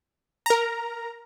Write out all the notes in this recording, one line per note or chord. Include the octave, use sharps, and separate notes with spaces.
A#4 A#5